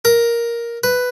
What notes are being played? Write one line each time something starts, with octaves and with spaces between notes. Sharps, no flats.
A#4
B4